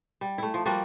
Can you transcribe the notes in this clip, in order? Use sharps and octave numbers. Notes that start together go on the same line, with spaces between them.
G3
A3 E4
F3
F3 G3 A#3 F#4